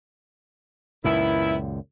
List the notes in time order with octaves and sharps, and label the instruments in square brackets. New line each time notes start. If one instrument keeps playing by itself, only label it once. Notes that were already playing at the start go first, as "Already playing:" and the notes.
[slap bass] C#2 F#2 A#2 [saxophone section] D#3 B3 E4